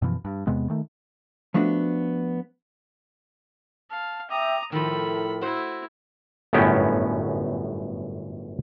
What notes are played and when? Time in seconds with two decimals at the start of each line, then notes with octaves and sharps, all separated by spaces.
0.02 F#2 B2 E3 F3
0.25 G2
0.47 E2 C3 G#3 B3
0.70 D#3 A3
1.54 F3 A3 B3 D4 F#4
3.90 F5 A5
4.30 E5 G5 A#5 D6 D#6
4.72 A2 D#3 F3 A4 A#4 B5
5.41 A3 E4 F#4 C5
6.53 G1 F#2 A2 B3 C#4 G5